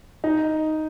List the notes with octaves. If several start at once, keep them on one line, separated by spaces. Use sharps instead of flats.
D#4